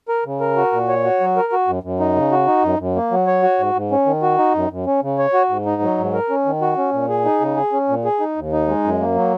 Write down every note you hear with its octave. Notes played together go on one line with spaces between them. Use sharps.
A#4
C#3
A#4
F#4
A#2
C#5
F#4
F#3
A#4
F#4
F#2
F#2
D#4
C#3
F#4
D#4
F#2
F#2
A#3
F#3
C#5
F#4
G#2
G#2
C#4
D#3
F#4
D#4
F#2
F#2
C#4
C#3
C#5
F#4
G#2
D#4
F#3
G#2
A#4
C#4
D#3
F#4
C#4
A#2
G#4
D#4
C#3
G#4
C#4
A#2
G#4
D#4
D#2
D#4
G#3
F#2
A#3
F#3